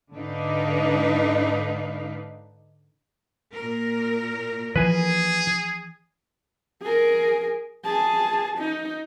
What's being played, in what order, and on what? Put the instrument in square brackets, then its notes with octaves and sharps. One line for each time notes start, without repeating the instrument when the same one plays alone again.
[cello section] G#2 D3 D4 D#4 B4 F5
A#2 A#4
[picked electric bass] E3 F3 [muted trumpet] G#4 [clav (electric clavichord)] B4 G#5
[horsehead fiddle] G#4 A#4
G#4 A5
D#4